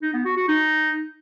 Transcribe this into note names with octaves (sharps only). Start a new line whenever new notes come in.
D#4
B3
F#4
F#4
D#4